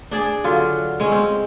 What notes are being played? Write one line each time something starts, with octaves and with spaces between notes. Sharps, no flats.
D4 G#4 D5
D3 F#3 F4
G#3 C#4
C4